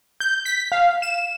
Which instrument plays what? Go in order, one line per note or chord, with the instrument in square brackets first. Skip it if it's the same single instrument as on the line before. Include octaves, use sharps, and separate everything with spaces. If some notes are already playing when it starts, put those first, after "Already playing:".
[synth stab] G6
B6
F5
E7